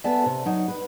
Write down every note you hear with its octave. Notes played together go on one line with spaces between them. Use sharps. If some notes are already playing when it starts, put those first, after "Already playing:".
B3 A4 D5 E5 G#5 A5
C3
F#3 D#4
B4